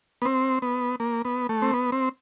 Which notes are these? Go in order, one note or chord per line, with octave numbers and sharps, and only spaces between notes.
B3
C4
B3
A#3
B3
A3
C4
B3
C4